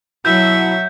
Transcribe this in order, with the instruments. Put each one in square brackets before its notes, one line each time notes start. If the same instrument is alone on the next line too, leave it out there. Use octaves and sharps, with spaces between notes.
[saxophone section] B2 E4 [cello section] F#3 [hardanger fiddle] E5 [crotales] G6